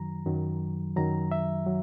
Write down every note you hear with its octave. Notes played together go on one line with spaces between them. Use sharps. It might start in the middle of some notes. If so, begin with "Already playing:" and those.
Already playing: F#2 D#3 F#3 A#5
F#2 D#3 F#3
F#2 D#3 F#3 A#5
E5
F#3